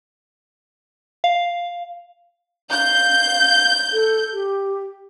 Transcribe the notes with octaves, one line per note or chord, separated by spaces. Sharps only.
F5
F5 G6
A4
G4